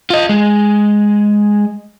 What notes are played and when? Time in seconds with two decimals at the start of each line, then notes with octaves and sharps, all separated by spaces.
0.10 F4 D#5
0.29 G#3